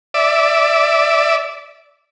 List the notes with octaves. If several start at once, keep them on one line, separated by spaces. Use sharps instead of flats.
D5 E5